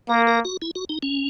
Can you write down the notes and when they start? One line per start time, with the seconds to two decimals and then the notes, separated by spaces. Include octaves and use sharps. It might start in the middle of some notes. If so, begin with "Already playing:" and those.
0.09 A#3 A#4
0.27 A#4
0.45 F#4
0.62 E4
0.75 F#4
0.89 D#4
1.03 C#4